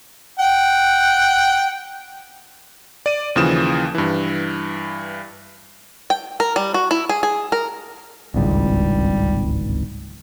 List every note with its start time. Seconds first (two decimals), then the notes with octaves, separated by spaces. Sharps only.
0.39 F#5 G5
3.06 D5 D#7
3.36 D#2 C#3 E3 F3 D#6 E7
3.95 G2 E3
6.10 G5
6.40 A#4
6.56 G3
6.74 F#4
6.91 E4
7.09 G#4
7.23 G#4
7.52 A#4
8.34 D1 G#1 C#2 G3